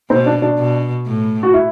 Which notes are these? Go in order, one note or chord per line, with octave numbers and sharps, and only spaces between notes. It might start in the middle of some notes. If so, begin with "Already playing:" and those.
B2 C4
D4
D4
B2
A2
F#4
E4